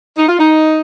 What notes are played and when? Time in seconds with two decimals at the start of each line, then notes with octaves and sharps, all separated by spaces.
0.17 D#4
0.28 F4
0.39 D#4